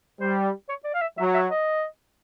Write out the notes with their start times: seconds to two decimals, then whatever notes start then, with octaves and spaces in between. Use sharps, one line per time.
0.20 G3 C5
0.69 C#5
0.84 D5
0.94 F5
1.02 E5
1.18 F#3 E5
1.34 E5
1.50 D#5